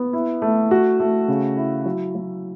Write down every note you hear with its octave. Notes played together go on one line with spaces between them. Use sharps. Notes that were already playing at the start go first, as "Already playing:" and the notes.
Already playing: B3
E4
A3
F#4
A3
C#3
E4
F#3
F#3